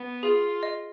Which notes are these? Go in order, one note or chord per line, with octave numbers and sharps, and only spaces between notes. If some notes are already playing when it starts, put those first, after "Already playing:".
Already playing: B3
F4 G#4
D#5